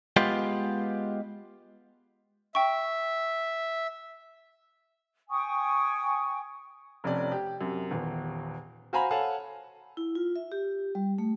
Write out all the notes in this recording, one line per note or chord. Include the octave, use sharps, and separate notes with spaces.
G#3 B3 F4 G4 B4 F5
E5 G5 C#6
G5 G#5 C#6 D#6
F1 F2 C#4 D5
G4
F#2 C3
D#1 E2
F#4 C5 F5 G#5 A#5 B5
A4 C#5 F5 F#5 G#5 A5
E4
F4
E5
G4
G3
A3